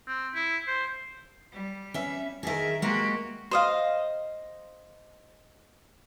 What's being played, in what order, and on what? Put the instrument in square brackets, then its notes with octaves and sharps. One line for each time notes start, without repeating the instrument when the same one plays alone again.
[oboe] C4
E4
C5
[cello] G3
[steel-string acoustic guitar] C#4 E5
[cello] D#3 A#4 [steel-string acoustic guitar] G#4 E5
[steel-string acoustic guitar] G#3 A#3 [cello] F#4 G4
[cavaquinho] C5 D#5 F5